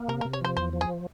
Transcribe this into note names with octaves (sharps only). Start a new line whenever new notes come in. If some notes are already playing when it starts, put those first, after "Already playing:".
Already playing: A#3
C3 A#4
A#4
C3
C#5
F3 C5
E2 C5
F3
G#4